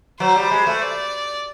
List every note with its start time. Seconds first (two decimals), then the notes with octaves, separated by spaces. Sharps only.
0.20 F#3 C5
0.36 G3
0.51 G#3
0.67 A3
0.82 D5